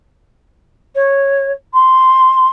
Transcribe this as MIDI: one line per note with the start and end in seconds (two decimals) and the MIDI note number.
0.95 1.51 73
1.73 2.51 84